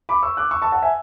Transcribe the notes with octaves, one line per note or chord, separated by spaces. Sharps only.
B5 D6
C#6 E6
D6 F#6
C#6 E6
A5 C#6
F#5 A5
E5 G#5